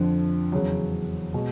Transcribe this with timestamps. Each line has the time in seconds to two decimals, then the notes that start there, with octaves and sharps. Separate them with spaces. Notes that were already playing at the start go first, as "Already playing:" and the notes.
Already playing: F2 D3 F3
0.52 E2 C#3 F#3
1.34 B2 G#3